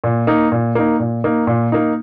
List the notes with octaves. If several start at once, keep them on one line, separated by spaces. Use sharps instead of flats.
A#2
A#3 D#4
A#2
A#3 D#4
A#2
A#3 D#4
A#2
A#3 D#4